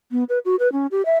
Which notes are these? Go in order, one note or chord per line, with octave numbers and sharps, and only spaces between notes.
B3
B4
F#4
B4
C#4
G4
E5